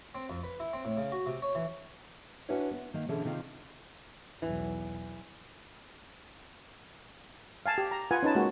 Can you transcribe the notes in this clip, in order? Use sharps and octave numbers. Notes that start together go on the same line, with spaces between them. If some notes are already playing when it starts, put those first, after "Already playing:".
C4
F2
B4
E4
C4
A2
C#3
F#4
C3
C#5
E3
C#4 D4 E4 F#4 B4 C#5
B3
D#3 A#3
B2 D3 E3 C#4 G#4 A4
C3 D#3 C4 F4
B1 E2 E3 F#3
F5 G#5 A5
G4
A#5
F4 B4 F#5 G#5
C#4 D#4 B4 A5
G#3 A#3 F#4